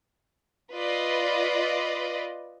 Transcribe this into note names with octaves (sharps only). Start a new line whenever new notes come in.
F4 B4 D5 D#5